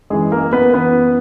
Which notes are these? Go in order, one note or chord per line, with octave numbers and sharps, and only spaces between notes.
F#2 E3 G#3 G#4
A#3 A#4
B3 B4
F#2 E3 B3 B4